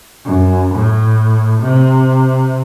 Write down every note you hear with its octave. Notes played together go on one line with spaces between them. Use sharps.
F#2
A2
C3